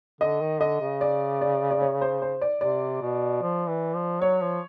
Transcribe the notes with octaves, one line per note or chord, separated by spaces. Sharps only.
D3 D#5
D#3
D3 D#5
C#3
D5
D5
D5
C#5
C5
C5
D5
C3 D5
B2
F3
E3
F3
F#3 C#5
F3